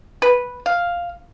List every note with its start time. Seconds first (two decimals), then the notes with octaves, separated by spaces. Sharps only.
0.22 B4
0.66 F5